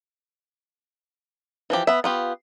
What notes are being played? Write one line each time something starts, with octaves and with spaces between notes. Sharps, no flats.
E3 F3 G4
B3 E5
B3 F4 G4